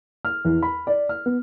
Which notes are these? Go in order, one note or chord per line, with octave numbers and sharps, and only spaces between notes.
F6
E2
B5
D5
F6
B3